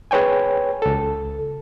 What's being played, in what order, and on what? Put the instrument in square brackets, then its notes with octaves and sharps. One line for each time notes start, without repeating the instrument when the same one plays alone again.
[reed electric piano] G#4 B4 C#5 G5 G#5
C#2 A4